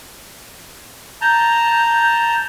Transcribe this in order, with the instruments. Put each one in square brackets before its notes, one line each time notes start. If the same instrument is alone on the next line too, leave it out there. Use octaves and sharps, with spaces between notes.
[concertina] A5 A#5 [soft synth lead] G6